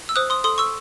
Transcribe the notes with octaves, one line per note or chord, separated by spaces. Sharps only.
E6
C5 D#6 F#6
C6 D#6
A4 C6 D#6
C#6 E6